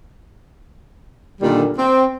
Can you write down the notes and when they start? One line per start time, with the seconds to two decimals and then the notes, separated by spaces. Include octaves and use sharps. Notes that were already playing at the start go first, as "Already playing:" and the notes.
1.41 A#2 D3 D#3 G3
1.78 C4